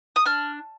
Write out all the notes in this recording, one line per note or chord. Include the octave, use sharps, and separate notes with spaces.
D#6
D4 F6